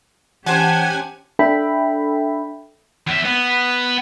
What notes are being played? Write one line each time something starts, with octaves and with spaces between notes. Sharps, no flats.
E3 C#4 G4 C5 F#5 G#5 A5 G#6
D4 A4 E5 G5 B5
E2 E5
B3